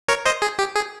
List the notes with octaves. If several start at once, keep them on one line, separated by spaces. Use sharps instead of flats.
A#4 C#5
C5 D#5
G#4
G4
G#4